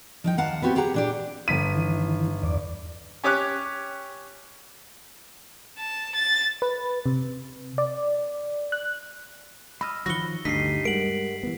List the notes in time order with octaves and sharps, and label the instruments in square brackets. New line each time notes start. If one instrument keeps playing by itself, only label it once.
[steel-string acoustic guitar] F3 D#4 G5
D#2 F5 F#5 A5 A#5
B3 C4 F#4 G4
G4 G#4 F#5 A#5
A#2 D4 G4
[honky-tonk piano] G1 B6 D#7
[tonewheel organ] D#3 E3
E2 D5
[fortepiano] C#4 G4 C#5 D6 F#6
[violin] A5
A6
[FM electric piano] B4
C3
D5
F#6
[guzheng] D#5 [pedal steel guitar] B5 E6 F6
[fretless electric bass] D#3 F3 F#3 [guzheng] F#4 F#5 [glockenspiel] A#6 G7
[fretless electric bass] D2 D3 [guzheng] G2 [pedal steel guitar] D#4 [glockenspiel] B6 C7
[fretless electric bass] G3 G#3 [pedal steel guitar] A#4 F#5 [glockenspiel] D7 F#7
[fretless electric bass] E3 B3